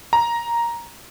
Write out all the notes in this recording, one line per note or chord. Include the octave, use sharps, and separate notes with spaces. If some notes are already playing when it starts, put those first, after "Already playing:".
A#5